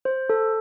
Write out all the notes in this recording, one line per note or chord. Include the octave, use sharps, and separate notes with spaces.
C5
A4